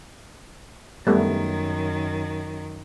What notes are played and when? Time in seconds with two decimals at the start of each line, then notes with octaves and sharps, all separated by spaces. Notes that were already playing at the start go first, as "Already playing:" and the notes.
1.07 F#2 D#3 G3 A3 B3